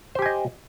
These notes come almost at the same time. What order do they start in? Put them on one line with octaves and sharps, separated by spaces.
C5 G4 G#5 D#5